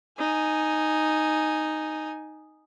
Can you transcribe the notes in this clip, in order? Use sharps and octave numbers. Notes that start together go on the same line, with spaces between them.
D#4 G#5